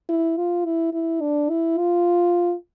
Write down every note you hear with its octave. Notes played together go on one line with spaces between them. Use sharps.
E4
F4
E4
E4
D4
E4
F4